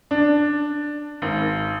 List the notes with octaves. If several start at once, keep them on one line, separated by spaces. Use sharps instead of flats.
D4
G#1